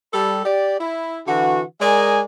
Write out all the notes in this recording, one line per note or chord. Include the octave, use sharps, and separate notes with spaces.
G3 A4
G4 D5
E4
D3 E3 F#4
G#3 A#4 D5 D#5 G#5